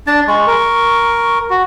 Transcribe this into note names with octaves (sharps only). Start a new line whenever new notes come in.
D4 A6
G#3 C#6
A#4
F#4